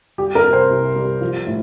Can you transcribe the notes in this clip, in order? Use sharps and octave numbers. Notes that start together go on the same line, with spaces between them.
G3 G4
A#4
C3
C5
C2
G3
F3
A2